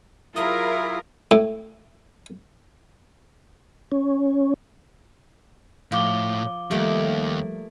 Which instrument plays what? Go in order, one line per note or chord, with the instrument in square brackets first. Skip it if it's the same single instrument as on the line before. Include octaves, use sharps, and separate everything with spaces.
[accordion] F#3 E4 E5 [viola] F4 [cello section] G#4 A#4 [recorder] D#6
[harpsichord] A2
[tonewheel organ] C#4
[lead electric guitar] A2 [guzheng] F3 [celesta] F5 D6 G7
[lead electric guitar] D#2 [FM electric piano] F3 G3 [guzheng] A3 A#3